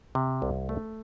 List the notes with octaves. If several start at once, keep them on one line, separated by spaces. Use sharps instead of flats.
C3
C2
A3